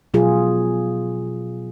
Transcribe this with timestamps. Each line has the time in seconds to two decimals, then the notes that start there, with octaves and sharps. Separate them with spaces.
0.14 B2 F#3 F4 G#4